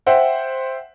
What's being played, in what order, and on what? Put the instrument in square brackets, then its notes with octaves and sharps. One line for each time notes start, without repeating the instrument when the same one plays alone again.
[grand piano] C5 E5 F#5 G5